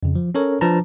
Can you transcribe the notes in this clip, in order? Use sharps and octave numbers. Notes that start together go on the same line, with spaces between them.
F2 C#3
F3
C#4 A4 A#4 C#5
F3 D4 B4 A5 A#5